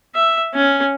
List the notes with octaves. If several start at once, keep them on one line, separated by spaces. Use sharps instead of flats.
E5
C#4